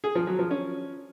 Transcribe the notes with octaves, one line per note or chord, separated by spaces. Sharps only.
G#4
F3
F#3
F3
C#4